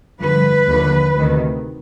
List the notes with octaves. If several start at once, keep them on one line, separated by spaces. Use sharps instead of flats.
G2 D3 F3 B4
D#2 D3 F3
D2 C3 D#3